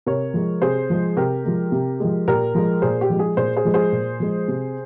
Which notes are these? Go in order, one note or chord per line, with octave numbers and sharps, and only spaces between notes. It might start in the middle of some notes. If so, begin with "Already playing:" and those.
C3 A#4 C#5
F3 G#3
C3 G#4 C5
F3 G#3
C3 G4 A#4
F3 G#3
C3
F3 G#3
A#2 G4 A#4
F3 G#3
A#2 G#4 C5
G4
F3 G#3
G#4
A#2 G#4 C5
G#4 C5
F3 G#3
G#4 C5
A#2
F3 G#3
C3